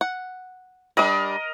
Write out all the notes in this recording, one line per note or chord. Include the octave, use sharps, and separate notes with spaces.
F#5
G3 D4 A#4 D#5